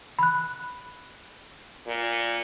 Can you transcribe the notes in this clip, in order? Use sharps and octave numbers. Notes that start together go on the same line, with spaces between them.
B5 F#6
A#2